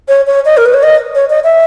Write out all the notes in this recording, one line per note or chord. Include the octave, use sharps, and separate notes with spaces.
C#5
C#5
D#5
A#4
B4
C#5
D#5
C#5
D#5
E5